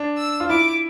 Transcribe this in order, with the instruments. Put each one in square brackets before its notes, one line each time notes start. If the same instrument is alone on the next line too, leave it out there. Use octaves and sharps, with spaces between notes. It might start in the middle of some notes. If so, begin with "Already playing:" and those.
Already playing: [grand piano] D4
[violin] E6
[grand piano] F4
[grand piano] E4 [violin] D6